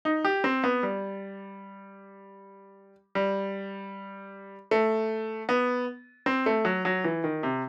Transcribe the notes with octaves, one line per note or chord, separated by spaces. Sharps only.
D#4
G4
C4
B3
G3
G3
A3
B3
C4
A3
F#3
F#3
E3
D#3
C3